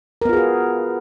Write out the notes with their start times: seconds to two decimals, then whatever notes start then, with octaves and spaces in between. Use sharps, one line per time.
0.22 A#4
0.25 B3
0.29 F4
0.33 G#4
0.37 F#4